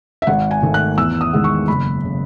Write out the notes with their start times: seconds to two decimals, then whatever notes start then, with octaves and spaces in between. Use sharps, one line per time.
0.22 E5
0.27 G#1 F#5
0.51 G#5
0.62 G#2 D#3 A3
0.74 F#6
0.98 E2 E6
1.21 D#6
1.33 D#3 G#3 B3
1.44 C#6
1.68 F#1 B5
2.05 C#3